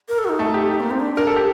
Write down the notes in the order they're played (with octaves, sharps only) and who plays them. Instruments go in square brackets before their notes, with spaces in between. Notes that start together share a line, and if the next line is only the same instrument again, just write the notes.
[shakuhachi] A#4
A4
F#4
D#4
[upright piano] A3 A4
G4
[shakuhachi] A#3
C4
D4
[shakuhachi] D4 [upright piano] A#4
[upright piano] A4
G4